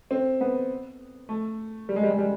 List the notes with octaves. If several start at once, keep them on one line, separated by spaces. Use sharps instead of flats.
C4
B3
A3
G3
G#3
G3
G#3
G3